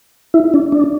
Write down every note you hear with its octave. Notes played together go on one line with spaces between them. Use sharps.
E4
D4
D4